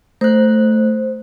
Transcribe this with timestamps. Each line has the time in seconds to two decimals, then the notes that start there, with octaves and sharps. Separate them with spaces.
0.21 A3 C5 F#6